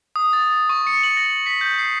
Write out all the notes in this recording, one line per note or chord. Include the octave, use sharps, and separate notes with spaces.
D#6
A6
C#6
C#7
F#7
A#6
B6
G6
C7